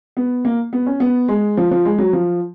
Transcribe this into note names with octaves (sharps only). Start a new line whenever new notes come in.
B3
A#3
B3
C#4
B3
G#3
F3
F3
G#3
F#3
F3